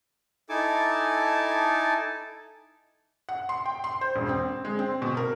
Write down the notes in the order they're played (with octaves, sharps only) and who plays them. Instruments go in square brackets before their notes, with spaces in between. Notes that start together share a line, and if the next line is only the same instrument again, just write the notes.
[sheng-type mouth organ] D#4 E4 A4 G#5 A5 D6
[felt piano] F#5
C6
G5
C6
C5
E1
C4
G#3
C4
B2
A#4